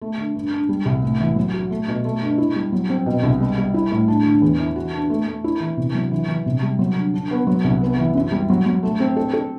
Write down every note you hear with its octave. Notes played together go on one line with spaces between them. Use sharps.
A3
D3
G2
D4
G3
C2
A2
E3
F#3
F#4
A3
B2
A3
G2
E4
G3
F#3
C4
B2
C2
G3
G3
E4
A2
D4
D3
E2
E3
F#4
D4
A3
A3
E4
E3
C3
F#3
E3
E3
C3
G3
F#3
D3
D4
B3
F#3
C2
B3
E3
F#2
G3
F#3
F#3
A3
C4
A4
A4